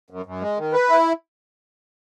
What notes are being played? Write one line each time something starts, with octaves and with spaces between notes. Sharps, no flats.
F#2
F#2
G#3
D#3
B4
E4